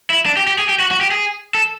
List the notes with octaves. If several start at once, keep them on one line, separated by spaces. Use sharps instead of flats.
E4
D4
G4
G4
G#4
G4
F#4
F#4
G4
G#4
A4